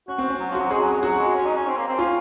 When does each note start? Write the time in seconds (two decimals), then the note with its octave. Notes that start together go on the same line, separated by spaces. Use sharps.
0.08 C#4 F#4
0.18 C4
0.29 C#4
0.39 F#3
0.50 F3
0.55 F#4
0.60 F#3
0.71 G#3 G#4
0.82 F#3
0.93 F#3
1.03 F#3 F#4
1.19 G#3
1.35 C#4
1.45 D#4
1.56 C#4
1.67 C4
1.77 A#3
1.88 C4
1.99 C#4 F4